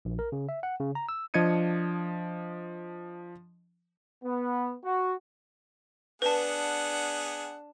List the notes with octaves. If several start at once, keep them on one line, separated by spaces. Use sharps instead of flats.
A#1
A#4
C#3
E5
F#5
C#3
A#5
E6
F3 D4 D#5 G#6 C#7 D#7
B3
F#4
B3 D4 G#4 B4 F#5 A5